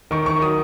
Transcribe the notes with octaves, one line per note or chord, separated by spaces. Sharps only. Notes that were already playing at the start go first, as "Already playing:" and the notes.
D#3 C#6
D#3 C#6
F#3 D#6